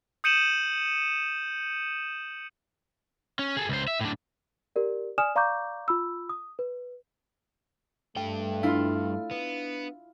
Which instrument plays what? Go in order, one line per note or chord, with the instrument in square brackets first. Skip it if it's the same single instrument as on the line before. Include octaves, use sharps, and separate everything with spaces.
[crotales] D#6 G6 C#7 D#7 E7 F#7
[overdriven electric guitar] C#4
G#4 A4
C#2 C5
E5
A2 D4
[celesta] G4 A#4 D5
D5 G#5 D#6 F6 E7
D5 F5 A#5 C#6 D6 G6
F4 B5 E6
D#6
B4
[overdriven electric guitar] G2 G5 [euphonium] A3
[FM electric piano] D4 F5 [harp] E4 F4
[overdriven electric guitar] B3